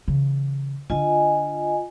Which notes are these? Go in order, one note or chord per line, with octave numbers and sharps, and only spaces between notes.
C#3 E3
D3 D4 F4 D#5 G#5